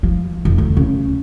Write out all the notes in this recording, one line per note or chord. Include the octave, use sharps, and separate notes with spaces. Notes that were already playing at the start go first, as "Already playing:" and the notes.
F3
F2
D2
C#3